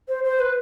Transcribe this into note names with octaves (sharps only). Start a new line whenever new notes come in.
C5
C5
B4